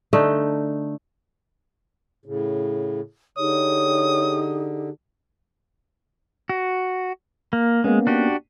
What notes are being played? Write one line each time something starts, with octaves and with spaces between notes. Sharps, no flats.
D3 A3 D#4
A2 C#3
D3 D#4 G4 G#4 C#5 D#6
F#4
A#3
G#3 A#3 B3 C#4
D4 F#4 G4